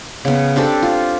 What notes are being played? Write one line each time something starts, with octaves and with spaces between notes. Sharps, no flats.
C#3 B3
C4 D4 G4 A4
F4